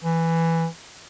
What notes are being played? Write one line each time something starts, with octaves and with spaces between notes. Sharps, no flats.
E3